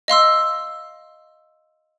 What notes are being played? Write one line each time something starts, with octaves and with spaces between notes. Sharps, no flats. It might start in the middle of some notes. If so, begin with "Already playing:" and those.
D#5 F5 C6 E6